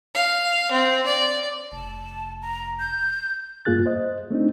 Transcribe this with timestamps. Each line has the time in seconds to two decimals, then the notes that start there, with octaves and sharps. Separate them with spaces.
0.15 F5
0.72 C4
1.06 D5
1.72 F1 A5
2.42 A#5
2.80 G6
3.65 G2 A#3 F4 G#4 F#6 A6
3.86 C5 D#5
4.31 A3 C4 D4 D#4